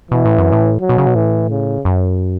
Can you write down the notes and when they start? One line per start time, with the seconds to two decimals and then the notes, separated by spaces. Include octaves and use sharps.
0.11 B2 E3
0.25 A2
0.38 F#2
0.52 A2
0.81 F#3
0.89 B2
0.98 C#3
1.07 B2
1.15 A2 E3
1.50 C#3
1.85 F#2